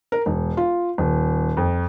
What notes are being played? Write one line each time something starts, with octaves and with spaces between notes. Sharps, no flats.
A#4
E1
F4
D#1
F2